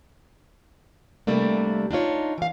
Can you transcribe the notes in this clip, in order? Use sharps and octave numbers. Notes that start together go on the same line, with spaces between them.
C3 G3 A3 A#3 D4
D4 D#4 F4 C#5
E3 F5